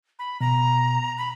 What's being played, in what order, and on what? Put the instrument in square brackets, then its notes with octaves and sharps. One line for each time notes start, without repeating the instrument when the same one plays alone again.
[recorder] B5
[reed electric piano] B2 [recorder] A#5
[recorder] B5